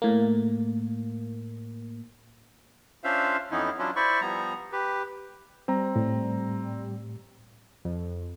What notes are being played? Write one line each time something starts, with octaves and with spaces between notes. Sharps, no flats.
A2 A#3
C#4 D4 F4 C5 E5 F5
F2 E3 B3 C#4 D#4 E4
F#3 C#4 D4 E4 F4
E4 C5 D5 B5 C#6
F3 G3 B3 A#5
G4 B4
G3 C4 A#5
A2
F2